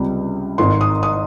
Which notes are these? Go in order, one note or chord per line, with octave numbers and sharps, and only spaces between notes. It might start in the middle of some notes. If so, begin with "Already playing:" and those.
Already playing: C#2 C3 G3 C4
G#1 G#2 D#3 C6
D#6
D#6